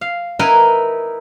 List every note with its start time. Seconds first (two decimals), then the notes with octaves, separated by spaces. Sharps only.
0.01 F5
0.39 D#4 E4 A#4 B4 D#5 G#5